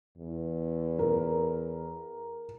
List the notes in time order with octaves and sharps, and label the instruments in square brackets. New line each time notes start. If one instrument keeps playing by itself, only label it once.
[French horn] E2
[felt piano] A#4